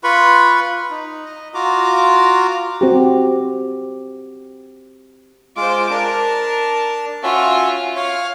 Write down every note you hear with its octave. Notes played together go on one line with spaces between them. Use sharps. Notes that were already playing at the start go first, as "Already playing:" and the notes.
F4 B4 B5 C#6
D#4
D#5
F4 F#4 A#5 D6
C4 F#4 G4
G#3 F4 C5 D6
D4 A#4 A5
C#4 F4 F#4 E5
C#5 F5